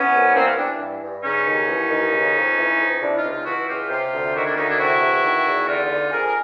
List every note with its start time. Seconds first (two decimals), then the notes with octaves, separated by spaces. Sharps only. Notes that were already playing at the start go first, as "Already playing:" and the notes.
Already playing: E3 B3 C#4
0.13 C2
0.35 E3 A#3 C4
0.46 B3 C#4
0.57 E3 C4 D4
0.80 G2
1.02 G2
1.24 C#3 C#4 D#4
1.46 D#2
1.68 E3
1.90 D#2
2.13 C#3
2.35 F2
2.58 E3
2.79 F2
3.01 C3 D4 E4
3.16 D#4 F4
3.24 C#2
3.31 D#4 F4
3.45 E3 E4 F#4
3.68 C#2 F4 G4
3.90 C3 F4 G4
4.12 D2
4.34 D#3 E4 F#4
4.45 D4 E4
4.56 D2 C#4 D#4
4.68 D4 E4
4.79 C3 E4 F#4
5.01 E2
5.23 D#3
5.46 E2
5.67 D3 D#4 F4
5.90 D3
6.12 F2 G#4 A#4
6.26 A#4